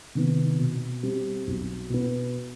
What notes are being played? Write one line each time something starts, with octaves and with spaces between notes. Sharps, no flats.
C3 D#3 B3
B2
G3 C4 G4
B1
B2 B3